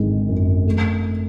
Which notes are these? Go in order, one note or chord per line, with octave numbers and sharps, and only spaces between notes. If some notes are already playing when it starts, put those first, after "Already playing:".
Already playing: G#1 D3 G#3
F#2
A3